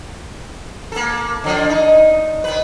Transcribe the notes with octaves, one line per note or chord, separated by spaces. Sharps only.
A#3 A4
D3 F3 D4
D#4
D#3 B4